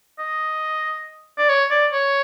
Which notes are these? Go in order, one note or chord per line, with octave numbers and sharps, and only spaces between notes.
D#5
D5
C#5
D5
C#5